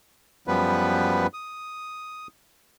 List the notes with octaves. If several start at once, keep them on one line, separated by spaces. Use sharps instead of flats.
F#2 F3 G3 B3 B4
D#6